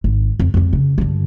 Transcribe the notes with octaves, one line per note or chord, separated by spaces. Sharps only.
G#1
F2
F2 G3
C#3
G2 D3